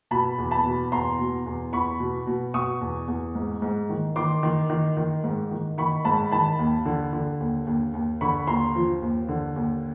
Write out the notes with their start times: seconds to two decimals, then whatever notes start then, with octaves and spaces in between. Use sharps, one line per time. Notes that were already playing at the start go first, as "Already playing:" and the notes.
0.11 B2 A5 B5
0.38 E2
0.51 A5 B5
0.65 B2
0.92 E2 A#5 C6
1.19 B2
1.46 E2
1.72 E2 B5 C#6
2.00 B2
2.27 B2
2.54 B2 C#6 D#6
2.81 E2
3.08 E2
3.35 G#2
3.62 G#2
3.89 D#3
4.16 D#3 C6 D6
4.43 D#3
4.70 D#3
4.97 D#3
5.24 G#2
5.51 D#3
5.78 D#3 B5 C#6
6.05 G#2 A5 B5
6.31 D#3 A5 B5
6.59 D#2
6.86 D3
7.13 D3
7.40 D#2
7.67 D#2
7.94 D#2
8.21 D3 B5 C#6
8.47 D#2 A#5 C6
8.75 F3
9.02 D#2
9.29 D3
9.56 D#2